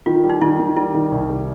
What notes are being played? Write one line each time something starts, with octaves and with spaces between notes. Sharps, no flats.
D#3 F4
G3
D#4
D#3 E4
D#3
G3 E4
D#3
C2
G3